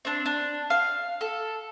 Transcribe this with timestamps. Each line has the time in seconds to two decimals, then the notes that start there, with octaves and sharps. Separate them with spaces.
0.05 C4 D4
0.26 D4
0.70 F5
1.21 A4